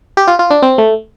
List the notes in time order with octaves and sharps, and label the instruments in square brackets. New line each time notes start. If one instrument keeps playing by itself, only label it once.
[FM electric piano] G4
F4
F4
D4
C4
A3